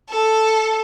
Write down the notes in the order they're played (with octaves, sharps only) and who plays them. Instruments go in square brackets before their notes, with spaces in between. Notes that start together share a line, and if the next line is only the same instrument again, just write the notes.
[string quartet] A4